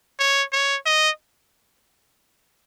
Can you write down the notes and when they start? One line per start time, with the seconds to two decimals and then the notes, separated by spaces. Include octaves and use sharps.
0.20 C#5
0.53 C#5
0.86 D#5